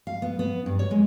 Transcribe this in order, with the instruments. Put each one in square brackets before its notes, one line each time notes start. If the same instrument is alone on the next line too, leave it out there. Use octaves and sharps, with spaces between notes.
[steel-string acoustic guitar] F5
B3
B3
G2
C#5
G#3